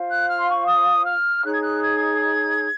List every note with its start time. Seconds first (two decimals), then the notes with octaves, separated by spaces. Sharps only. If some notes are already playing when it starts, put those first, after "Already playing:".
Already playing: F4 C5
0.09 F#6
0.28 F6
0.39 C6
0.48 C#6
0.67 D#6
1.04 F6
1.43 D#4 G#4 C#5 F#6
1.51 G#6
1.61 F#6
1.81 G#6